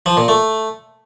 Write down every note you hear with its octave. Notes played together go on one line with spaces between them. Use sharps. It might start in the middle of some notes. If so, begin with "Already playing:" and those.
F3
A#2
A3